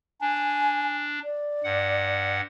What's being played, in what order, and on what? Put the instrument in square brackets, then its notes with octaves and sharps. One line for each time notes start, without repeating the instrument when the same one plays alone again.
[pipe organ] D4 [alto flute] G#5
[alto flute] D5
[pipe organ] G2 F#5